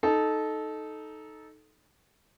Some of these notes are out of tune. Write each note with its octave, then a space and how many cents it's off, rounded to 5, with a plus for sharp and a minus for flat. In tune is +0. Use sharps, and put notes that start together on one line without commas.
D#4 +0 A4 -15